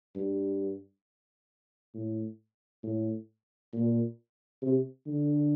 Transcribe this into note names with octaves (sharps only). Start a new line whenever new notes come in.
G2
A2
A2
A#2
C3
D3